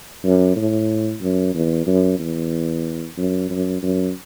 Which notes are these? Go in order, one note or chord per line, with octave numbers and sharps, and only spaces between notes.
F#2
A2
F#2
E2
F#2
E2
F#2
F#2
F#2